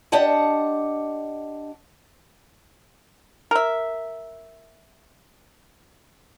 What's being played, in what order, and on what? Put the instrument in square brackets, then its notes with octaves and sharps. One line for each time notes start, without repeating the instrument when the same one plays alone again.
[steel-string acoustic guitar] D4 G4 D#5 F#5 A5
[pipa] A#4 E5